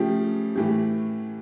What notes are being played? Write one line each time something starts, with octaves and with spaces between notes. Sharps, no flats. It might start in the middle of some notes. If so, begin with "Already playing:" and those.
Already playing: C#3 F3 A3 G4
A2 E3 A3 G4